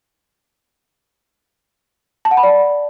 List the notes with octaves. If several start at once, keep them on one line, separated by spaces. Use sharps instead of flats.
A5
F#5
B5
D5